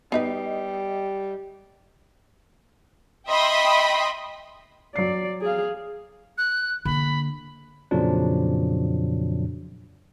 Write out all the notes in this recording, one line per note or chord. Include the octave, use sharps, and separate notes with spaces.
G3 B3 D#4 B4 D#5 C7
D#5 E5 G5 B5 C6 D#6
F#3 D5 C7
G#4 F5
F#6
D3 A#3 B5
F2 A#2 C#3 F3 F#3 D4